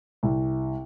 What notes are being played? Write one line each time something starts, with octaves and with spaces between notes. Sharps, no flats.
C2